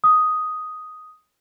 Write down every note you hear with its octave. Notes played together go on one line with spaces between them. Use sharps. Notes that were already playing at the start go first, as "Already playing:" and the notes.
D#6